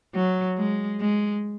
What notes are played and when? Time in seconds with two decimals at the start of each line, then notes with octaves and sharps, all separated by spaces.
0.15 F#3
0.58 G#3
1.01 G#3